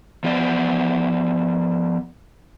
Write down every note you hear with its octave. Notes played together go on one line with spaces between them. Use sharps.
F3 B3 D5